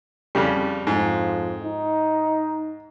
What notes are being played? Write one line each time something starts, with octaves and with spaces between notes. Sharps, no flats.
F2 C#3 G3
F2 G#2
D#4